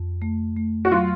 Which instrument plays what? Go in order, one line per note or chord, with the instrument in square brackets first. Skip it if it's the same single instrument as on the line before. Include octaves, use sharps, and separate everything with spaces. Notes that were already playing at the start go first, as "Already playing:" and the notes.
Already playing: [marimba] F2
A3
A3
[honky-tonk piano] F#4
[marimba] F#3 [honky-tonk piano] F4